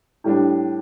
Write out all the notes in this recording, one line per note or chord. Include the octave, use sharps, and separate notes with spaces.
A2 G3 D4